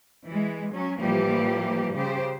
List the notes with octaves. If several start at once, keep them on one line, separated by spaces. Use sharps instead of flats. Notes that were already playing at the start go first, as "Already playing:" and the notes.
E3 G#3
F#3 C#4
A2 E3 F3 G3 A#3 G4
C#3 G4 C5